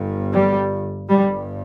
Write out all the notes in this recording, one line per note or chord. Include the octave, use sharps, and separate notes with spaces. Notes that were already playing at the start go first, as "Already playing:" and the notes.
Already playing: G1 G2
G3
G1 G2 G3